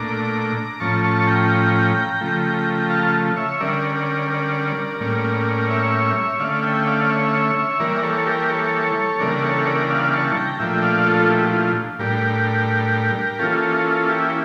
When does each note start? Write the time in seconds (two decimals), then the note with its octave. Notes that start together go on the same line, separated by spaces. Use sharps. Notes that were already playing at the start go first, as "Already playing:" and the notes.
Already playing: A#2 A3 D4 A#5 D6
0.80 A2 F3 C#4 A5 C#6
1.04 A5 C#6
1.27 G5 A#5
2.21 C#3 F3 A3
2.90 F5 A5
3.36 C#5 E5
3.60 D3 G3 C#4 A#4 D5
3.95 A#4 D5
4.30 A#4 D5
5.00 A2 G3 A#3 C#4
5.70 C#5 E5
6.40 D3 A3 C#4 D5 F5
6.63 E5 G5
6.87 D5 F5
7.10 C#5 E5
7.79 E3 G3 A#3 A#4 D5
8.03 A4 C#5
8.26 G4 A#4
8.50 A4 C#5
9.20 C#3 E3 G3 A#3 D4 A#4 D5
9.43 A4 C#5
9.67 A#4 D5
9.90 D5 F5
10.13 A5 C#6
10.36 G5 A#5
10.59 A#2 F3 A3 D4 E5 G5
10.83 D5 F5
11.06 F4 A4
11.29 E4 G4
11.46 G4
11.53 F4
11.99 A2 G3 D4 G4 A#4
13.39 E3 A#3 C#4 F4 A4
14.09 E4 G4